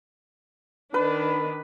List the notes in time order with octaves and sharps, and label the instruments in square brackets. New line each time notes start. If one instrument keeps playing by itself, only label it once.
[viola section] D#3 D4 [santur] B4